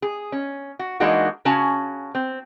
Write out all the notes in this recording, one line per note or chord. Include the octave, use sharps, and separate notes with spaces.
G#4
C#4
F#4
E3 G#3 A#3 D4 D#4 F#4
C#3 C#4 F#4 G#5 A5
C4